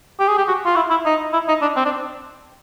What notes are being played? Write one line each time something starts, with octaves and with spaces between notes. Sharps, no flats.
G4
G#4
G4
F#4
F4
E4
E4
D#4
E4
D#4
D4
C4
D4